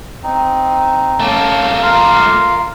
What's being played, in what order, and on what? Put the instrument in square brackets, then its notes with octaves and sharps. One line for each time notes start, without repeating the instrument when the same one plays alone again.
[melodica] C4 D#4
[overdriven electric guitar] A3 A#3 [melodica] C#4 A5
[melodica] F4 A#4 F5